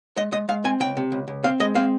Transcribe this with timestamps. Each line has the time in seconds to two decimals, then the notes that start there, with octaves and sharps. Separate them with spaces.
0.17 G#3 D#5
0.32 G#3 D#5
0.49 G#3 F5
0.64 C4 G#5
0.80 C#2 G5
0.97 C3
1.12 C#2
1.28 C#2
1.44 C4 F5
1.60 G#3 D#5
1.75 C4 F5